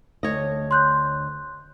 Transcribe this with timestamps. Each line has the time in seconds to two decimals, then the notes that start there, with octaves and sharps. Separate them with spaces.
0.23 D2 C#5 D#5
0.71 C6 F#6 G6